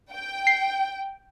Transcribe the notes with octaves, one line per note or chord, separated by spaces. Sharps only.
G5
C7